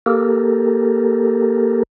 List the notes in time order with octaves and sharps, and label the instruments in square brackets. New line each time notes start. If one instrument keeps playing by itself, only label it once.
[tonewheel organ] A#3 G4 A4 A#4